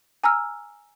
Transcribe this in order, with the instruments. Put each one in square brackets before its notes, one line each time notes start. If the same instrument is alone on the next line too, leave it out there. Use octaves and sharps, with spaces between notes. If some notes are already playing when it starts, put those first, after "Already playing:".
[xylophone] G#5 A#5 E6 F6